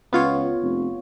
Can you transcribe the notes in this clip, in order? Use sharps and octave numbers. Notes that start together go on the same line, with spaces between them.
C#2 B3 F4 C#5
F1